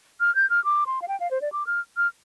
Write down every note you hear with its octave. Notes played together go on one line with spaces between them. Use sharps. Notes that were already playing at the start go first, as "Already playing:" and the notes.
F6
G6
F6
D6
C6
F5
G5
F5
C5
D5
D6
F6
F6